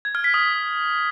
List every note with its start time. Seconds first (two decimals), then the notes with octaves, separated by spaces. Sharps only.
0.05 G#6
0.15 F6
0.24 B6
0.34 D#6